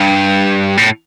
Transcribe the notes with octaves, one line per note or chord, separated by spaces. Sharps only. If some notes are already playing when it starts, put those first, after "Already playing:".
Already playing: G2
A2